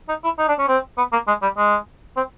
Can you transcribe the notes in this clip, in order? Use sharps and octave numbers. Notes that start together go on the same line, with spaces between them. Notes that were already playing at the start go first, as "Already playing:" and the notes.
D#4
E4
D#4
D4
C#4
C4
B3
A#3
G#3
G3
G#3
C4